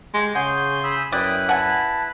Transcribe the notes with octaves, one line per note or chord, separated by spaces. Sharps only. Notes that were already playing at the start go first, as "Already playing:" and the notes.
G#3 G4
C#3 G#4 C#5 F#5 G#5 C6 G6
B5 D#6 E6
F#2 E4 B4 D5 G5 B5 D#6
F#5 G#5 A5